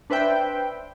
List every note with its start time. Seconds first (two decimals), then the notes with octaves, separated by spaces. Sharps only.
0.10 D4 B4 C5 E5 G5